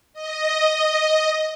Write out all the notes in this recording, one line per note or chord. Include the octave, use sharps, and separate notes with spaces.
D#5